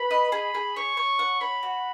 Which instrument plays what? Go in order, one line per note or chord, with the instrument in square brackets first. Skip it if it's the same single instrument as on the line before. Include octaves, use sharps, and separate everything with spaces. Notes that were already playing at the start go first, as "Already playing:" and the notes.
Already playing: [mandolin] B4 [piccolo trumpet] B5
[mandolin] D#5
G#4
G#4
[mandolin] C#5 [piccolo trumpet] C#6
[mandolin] C#5
F#5
[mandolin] C#5 [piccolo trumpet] B5
[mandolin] F#4